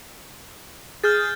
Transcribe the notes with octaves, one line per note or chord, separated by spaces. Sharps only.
G#4 F6 G6 A6